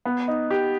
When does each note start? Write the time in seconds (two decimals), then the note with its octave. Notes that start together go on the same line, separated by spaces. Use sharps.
0.05 B3
0.28 D#4
0.50 G4